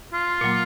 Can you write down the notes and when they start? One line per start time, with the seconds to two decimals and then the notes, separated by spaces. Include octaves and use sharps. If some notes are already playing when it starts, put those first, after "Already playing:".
0.13 F4
0.41 A#2 F#3 A#3